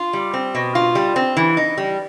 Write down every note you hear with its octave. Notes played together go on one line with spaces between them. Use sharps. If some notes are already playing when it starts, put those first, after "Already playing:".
Already playing: F4
G3
C4
B2
F4
G3
C4
E3
D#4
G3